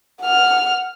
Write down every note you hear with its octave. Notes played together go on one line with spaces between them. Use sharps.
F#5 F6